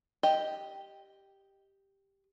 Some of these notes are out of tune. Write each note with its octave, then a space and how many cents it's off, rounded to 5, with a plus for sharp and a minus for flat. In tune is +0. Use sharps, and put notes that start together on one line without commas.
G4 +0 D#5 +0